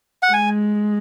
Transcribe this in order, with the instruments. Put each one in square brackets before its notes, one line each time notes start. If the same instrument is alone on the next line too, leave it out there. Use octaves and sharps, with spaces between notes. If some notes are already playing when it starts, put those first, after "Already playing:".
[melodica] F#5
[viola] G#3 [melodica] G#5